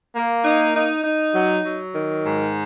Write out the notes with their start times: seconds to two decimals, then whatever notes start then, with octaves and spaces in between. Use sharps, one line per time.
0.15 A#3
0.44 D#4
0.75 D#4
1.04 D#4
1.35 F#3
1.65 F#3
1.95 D#3
2.26 G#2